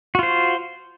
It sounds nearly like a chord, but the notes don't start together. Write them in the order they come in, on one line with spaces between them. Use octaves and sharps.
F#4 F4 C5